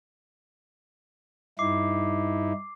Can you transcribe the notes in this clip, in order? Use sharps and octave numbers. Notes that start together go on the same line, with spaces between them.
G2 D#4 E4 D6 C7